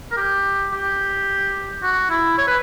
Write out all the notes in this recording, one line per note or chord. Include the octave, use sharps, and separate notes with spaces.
A#4
G4
G4
F#4
E4
C#5
B4